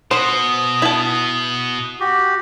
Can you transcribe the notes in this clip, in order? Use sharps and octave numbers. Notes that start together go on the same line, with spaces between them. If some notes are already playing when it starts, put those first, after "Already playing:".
B2 B3 C5 D#6
E4 A5
F#4 G4